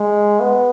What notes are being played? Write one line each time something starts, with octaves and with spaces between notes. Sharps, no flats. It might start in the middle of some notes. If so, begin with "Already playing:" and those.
Already playing: G#3
B3